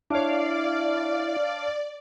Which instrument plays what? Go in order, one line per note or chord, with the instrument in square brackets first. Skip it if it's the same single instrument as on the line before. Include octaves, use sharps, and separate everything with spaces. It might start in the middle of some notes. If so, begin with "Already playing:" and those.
[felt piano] D4 C#5 [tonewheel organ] E4 [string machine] D5 [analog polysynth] F5 D6